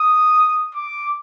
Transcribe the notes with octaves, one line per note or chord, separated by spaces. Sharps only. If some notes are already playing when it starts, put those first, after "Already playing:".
Already playing: D#6
D6